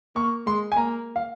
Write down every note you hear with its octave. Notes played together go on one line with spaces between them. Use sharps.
A#3 C#6
G#3 C6
G#5
A#3 A#5
F5